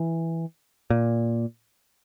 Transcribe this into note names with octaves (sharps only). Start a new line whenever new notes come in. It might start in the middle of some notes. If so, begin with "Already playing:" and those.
Already playing: E3
A#2